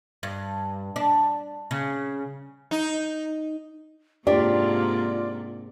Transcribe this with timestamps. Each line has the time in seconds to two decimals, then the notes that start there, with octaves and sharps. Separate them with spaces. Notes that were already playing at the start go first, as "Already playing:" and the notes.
0.23 G2
0.96 D4
1.71 C#3
2.71 D#4
4.27 G#2 C3 A#3 D4 F4 G4 D5